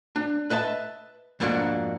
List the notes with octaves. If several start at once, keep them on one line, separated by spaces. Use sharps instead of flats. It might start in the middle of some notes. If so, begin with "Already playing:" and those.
D4
B4 D#5 E5 A5
F2 G#2 B2 A#3 D4 F#4